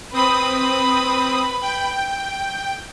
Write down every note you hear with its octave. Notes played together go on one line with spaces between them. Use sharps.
C4 B4 B5 D#6
G5